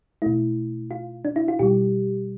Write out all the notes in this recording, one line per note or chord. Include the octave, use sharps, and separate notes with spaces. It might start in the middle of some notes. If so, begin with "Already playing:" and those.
B2 A3 E4
F4
D4
E4
F4
B2 G3 G4